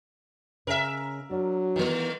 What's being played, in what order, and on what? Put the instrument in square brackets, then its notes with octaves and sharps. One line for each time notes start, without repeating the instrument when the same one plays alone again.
[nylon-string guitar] C#3 C#4 [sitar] A#4 E5
[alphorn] F#3 [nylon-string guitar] D4
[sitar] D#3 A3 [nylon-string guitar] E3 G3 B3